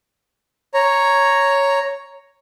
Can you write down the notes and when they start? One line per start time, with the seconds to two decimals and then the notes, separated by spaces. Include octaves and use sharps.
0.74 C#5 A#5